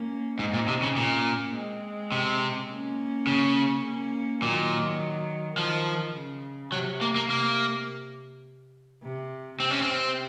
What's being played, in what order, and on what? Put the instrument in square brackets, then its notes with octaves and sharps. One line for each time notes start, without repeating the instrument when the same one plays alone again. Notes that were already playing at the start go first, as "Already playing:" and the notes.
Already playing: [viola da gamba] A#3 C#4
[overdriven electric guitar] G#2 [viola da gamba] C4 D#4
[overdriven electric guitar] A#2
C3
C#3
[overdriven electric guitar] A#2 [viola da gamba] A#3 C#4
[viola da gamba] G#3 C4
[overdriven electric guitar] C3
[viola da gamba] A#3 C#4
[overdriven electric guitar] C#3
[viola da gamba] A#3 C#4
[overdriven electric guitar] A#2 [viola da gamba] D#3 F#3
[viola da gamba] D#3 [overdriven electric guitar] F3
[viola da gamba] C#3
[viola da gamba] C3 [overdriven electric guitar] F#3
[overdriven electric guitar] A#3
A#3
[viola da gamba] C3 [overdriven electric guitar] A#3
[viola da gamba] C3
[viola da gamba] C3 [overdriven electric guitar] C4
[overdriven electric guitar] C#4
C4